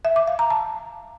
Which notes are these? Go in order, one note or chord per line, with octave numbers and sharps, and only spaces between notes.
E5
D6
F5
A#5
A5